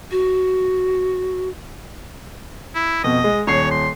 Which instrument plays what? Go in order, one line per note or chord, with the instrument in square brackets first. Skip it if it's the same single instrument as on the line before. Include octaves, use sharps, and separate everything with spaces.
[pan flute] F#4
[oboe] E4
[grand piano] F2 B2 [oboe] D#5
[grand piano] G#3
[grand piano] D#1 C7 [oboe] C#5
[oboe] C6